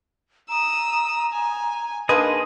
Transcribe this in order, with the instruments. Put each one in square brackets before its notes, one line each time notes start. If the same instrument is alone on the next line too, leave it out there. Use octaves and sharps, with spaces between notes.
[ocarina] A#5 [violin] D#6 E6
[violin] G#5
[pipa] A#3 D4 B4 [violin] D#4 [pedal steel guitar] G#4 D#5 [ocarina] C6